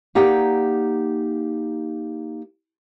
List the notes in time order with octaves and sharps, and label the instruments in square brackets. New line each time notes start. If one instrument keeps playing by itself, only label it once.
[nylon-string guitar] A#3 D#4 G4 D5 F#5 G5